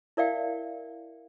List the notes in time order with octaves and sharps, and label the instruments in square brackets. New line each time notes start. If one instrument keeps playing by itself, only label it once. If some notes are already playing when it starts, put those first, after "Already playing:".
[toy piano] E4 A#4 D5 E5 F5 G5